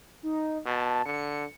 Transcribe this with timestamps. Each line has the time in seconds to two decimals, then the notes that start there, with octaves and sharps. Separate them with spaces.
0.23 D#4
0.66 B2 A5
1.06 D3 C#7